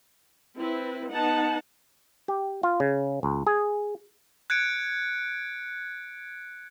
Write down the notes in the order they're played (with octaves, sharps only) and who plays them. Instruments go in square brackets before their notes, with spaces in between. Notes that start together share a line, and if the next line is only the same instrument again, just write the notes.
[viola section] C4 E4 B4
B3 D#4 F#5 A5
[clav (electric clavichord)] G4
F4
C#3
C#2
G#4
[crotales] F#6 G#6 C#7 D7